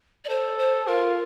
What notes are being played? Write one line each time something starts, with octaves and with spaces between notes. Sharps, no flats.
D5
A4 C5
C5
F4 A#4